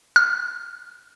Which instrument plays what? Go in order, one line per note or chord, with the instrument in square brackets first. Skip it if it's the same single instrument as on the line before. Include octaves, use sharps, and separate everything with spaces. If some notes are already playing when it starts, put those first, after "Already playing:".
[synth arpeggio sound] F6